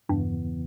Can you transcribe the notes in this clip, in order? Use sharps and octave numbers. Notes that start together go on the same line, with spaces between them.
E2 G2 C#3 E3 B3